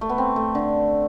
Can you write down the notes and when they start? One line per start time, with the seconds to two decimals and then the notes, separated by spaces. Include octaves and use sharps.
0.01 A3
0.09 B3
0.18 C4
0.36 A3
0.55 D3